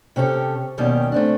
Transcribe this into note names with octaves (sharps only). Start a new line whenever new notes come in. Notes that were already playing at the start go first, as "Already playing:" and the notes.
C3 C#4 G4 A4
D#2 B2 D#3 G3 C#4
A3 C4 D4